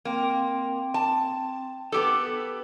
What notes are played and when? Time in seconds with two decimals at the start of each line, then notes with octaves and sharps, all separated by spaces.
0.05 A#3 C4 G5 C6
0.94 A5
1.92 B3 G4 A4